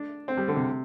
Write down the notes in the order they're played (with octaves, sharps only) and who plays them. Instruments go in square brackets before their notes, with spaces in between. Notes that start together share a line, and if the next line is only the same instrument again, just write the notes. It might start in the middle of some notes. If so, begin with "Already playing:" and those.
Already playing: [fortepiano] D4
C4
G3
D3
C3